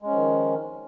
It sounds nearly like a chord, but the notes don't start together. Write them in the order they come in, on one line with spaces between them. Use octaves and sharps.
G#3 C#4 F3 D#3